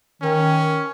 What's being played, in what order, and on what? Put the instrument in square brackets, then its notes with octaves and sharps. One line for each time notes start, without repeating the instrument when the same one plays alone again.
[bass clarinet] D#3 [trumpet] C#4